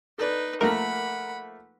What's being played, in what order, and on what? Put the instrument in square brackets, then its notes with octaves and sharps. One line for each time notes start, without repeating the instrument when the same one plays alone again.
[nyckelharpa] D#4 B4 [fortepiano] A4 D5
[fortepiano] F3 A3 A#3 [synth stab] A#4 [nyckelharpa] F#5 B5